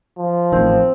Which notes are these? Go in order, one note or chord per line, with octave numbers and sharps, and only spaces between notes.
F3
A1 D#3 C4